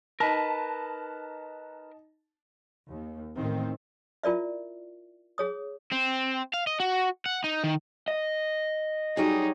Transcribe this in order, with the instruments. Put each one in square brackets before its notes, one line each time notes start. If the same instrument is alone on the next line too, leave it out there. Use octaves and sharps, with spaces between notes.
[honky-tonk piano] D#4 A5 [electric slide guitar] A#4 B4
[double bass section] D#2
A1 D#3 C4
[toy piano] E4 F4 A#4 D5 E5
G#4 C#5 D#6
[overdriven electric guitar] C4
F5
D#5
F#4
F#5
D#4
D#3
D#5
[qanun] F#3 G3 G#4 [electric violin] D#4